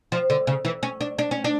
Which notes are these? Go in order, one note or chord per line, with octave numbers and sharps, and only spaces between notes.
F3
D3
C#3
E3
C#4
D4
D4
C#4
D4